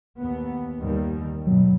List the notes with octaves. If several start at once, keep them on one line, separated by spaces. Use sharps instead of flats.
D#2 B3
D#2 D#3 G3
G2 B2 F#3